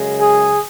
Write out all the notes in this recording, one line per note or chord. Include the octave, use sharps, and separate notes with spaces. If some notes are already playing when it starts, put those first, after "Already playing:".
Already playing: F#2 C#3 G#3
G#4